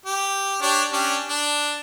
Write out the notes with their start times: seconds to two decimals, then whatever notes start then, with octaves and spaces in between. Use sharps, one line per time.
0.06 G4
0.62 D4 G4 C#5
0.93 C#4 D4 G4
1.29 D4